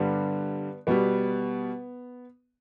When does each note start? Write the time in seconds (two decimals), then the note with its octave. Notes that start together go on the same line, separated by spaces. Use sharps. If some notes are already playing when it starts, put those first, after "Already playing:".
Already playing: G2 D3 G3 B3
0.87 B2 G3 B3